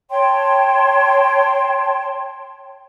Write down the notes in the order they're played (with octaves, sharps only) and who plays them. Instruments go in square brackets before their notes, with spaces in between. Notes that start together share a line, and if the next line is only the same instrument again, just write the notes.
[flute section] C#5 G5 A5 C6